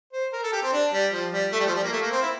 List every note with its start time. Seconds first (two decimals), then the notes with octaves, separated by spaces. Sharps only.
0.13 C5
0.33 A#4
0.43 A4
0.52 G4
0.63 C4
0.73 D4
0.93 G3
1.13 F3
1.32 G3
1.52 A3
1.60 G3
1.66 F3
1.74 G3
1.84 A#3
1.92 A3
2.02 A#3
2.12 C4
2.22 E4